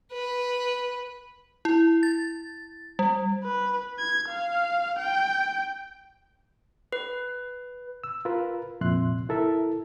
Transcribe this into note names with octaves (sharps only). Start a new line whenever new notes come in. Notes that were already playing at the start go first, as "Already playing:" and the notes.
B4
E4
A6
G3
B4
G#6
F5
G5
B4
E6
F4 A#4 B4
C2 F2 A#2 E5 C6 F#6
E4 A4 A#4 E5